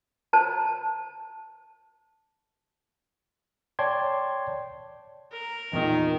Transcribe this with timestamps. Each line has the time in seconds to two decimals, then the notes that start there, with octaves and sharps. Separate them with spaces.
0.33 C5 A5 A#5
3.79 C#5 D5 G5 A5 C6 G#6
5.33 A#4
5.73 E2 A#2 D#3